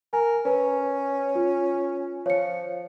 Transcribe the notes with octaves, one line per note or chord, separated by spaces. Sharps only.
A#4 G#5
C#4 B4
F4
F3 C#5 C#7